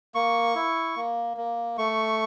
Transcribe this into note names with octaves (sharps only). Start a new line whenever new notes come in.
A#3 C#6
E4
A#3
A#3
A3 C#6